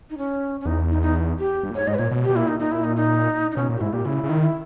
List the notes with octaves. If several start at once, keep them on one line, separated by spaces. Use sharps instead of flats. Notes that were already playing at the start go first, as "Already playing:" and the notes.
D#4
C#4
C#4
E2 D#4
D#4
D#4
G4
G2
A#2
G#2 C#5
G#2 D#5
B4
A#2 C#5
B2
G4
B2
A#2 E4
D#4
A#2 D#4
E4
D#4
D#4
D#4
B2 C#4
A#2
G4
G#2 E4
A#2 G4
C#3 E4
C#3
D#3
E4